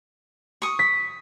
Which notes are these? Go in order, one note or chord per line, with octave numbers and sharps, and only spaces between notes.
C#6 D#6
B6